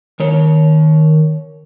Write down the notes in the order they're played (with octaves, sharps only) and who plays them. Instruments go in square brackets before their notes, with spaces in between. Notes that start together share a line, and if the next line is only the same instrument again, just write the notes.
[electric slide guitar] D#3 C#5